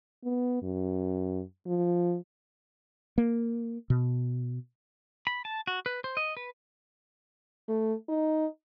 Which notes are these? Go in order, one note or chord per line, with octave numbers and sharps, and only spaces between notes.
B3
F#2
F3
A#3
B2
B5
A5
F#4
B4
C5
D#5
B4
A3
D#4